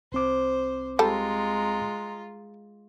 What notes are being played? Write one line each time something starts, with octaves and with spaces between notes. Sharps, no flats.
C2 C4 C5 D6
G3 G#3 F4 A4 A#5